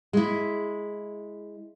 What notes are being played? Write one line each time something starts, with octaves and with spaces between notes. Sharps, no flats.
G#3 E4